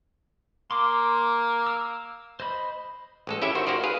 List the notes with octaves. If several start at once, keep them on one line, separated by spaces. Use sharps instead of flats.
A#3 C6 D6
E6
C5 D#5 B5
A1 G#3 A4
C#4 E4 G4 E5
D#3 F#4 C5
A#3 F#4 G4 C5 D5
G#4 B4 F5